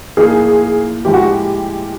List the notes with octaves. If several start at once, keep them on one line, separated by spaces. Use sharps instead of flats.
A2 F3 A#3 D#4 G#4
A2 F3 G#3 G4
F#4
G4